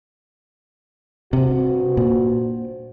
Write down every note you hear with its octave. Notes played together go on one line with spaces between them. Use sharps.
G2 C3 F#4 C5
A#2